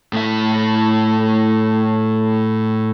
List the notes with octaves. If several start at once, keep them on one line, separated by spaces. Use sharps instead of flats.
A2 E5